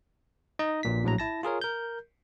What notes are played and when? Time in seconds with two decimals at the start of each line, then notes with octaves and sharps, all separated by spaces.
0.59 D#4 D#5
0.83 A#1 A#2 B6
1.03 A#1 A2 F#3 A#5
1.18 E4 A5 A#6
1.43 F4 G#4 A#4 C#5
1.61 A#4 G6